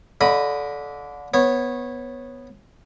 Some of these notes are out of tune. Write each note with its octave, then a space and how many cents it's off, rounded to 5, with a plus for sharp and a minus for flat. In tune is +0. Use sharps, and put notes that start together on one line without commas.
D3 -25 D#5 +0 B5 -15
B3 +0 C#5 -20